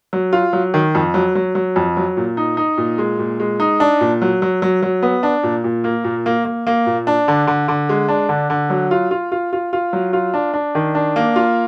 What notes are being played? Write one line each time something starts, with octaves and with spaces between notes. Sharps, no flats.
F#3
F4
F#3
D#3
F2
F#3
F#3
F#3
F2
F#3
A#2
D#4
D#4
A#2
G#3
A#2
G#3
D#4
D4
A#2
F#3
F#3
F#3
F#3
B3
D4
A#2
A#2
A#3
A#2
A#3
A#3
A#3
A#2
D4
D3
D3
D3
G#3
D4
D3
D3
F#3
F4
F4
F4
F4
F4
F#3
F4
D4
D4
D#3
D4
A#3
F4